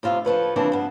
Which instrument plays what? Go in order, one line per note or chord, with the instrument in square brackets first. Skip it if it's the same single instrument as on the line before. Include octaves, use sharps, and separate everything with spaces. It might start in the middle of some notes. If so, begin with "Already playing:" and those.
[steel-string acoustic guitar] A2 C3 F4 C5 E5
F3 A4 B4 C#5
C#3 E3 F3 A#3 C4 D4
G2 B3